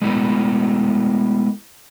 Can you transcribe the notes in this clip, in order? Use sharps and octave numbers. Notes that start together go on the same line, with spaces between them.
G#3 A3 B3 D#4 E4 A#4